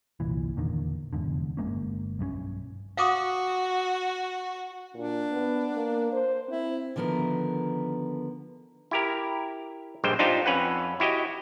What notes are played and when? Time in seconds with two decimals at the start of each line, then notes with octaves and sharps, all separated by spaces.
0.20 G1 C2 A#2 E3
0.57 E2 A#2 D3 D#3
1.13 F1 E2 G#2 D3
1.57 G1 G#3 A#3 C#4
2.19 B1 G2 G3 C#4
2.97 F#4 F5 D6 D#6
4.94 A#2 D4
5.32 B3
5.76 A#3
6.12 C5
6.49 C4 E4
6.96 D3 D#3 F3 B3 A#4
8.91 E4 G4 A#4
10.04 A#1 G2 G3 G#3 C5 G5
10.19 D4 D#4 F4 G4 C5
10.46 F2 C#4 B4 F#5
11.00 E4 F#4 G4 D#5